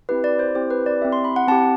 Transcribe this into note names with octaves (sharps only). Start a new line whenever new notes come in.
C4 E4 G4 B4
D5
C5
C4 E4 G4 C5
B4
D5
C4 E4 G4 E5
C6
B5
F#5
C4 E4 G4 A5